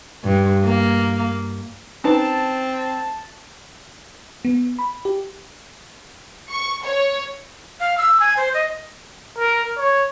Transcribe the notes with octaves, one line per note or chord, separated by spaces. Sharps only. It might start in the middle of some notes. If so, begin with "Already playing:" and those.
G2
A#3
C4 C#4 D#4 B4 A5
B3
B5
G4
C#6
C#5
F5
E6
G#5
C5
D#5
A#4
C#5